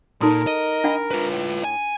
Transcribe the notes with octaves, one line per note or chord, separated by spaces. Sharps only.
A#2 D#4 A4 A#4 C6
D#5
D4 F#5 B5
F4 B4
A2
G#5